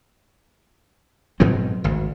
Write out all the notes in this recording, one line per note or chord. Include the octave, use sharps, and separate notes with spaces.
G#2 B2 F#3 C4
G#1 D2